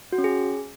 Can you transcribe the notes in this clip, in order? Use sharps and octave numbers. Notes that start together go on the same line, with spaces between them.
F#4
C#4
G#4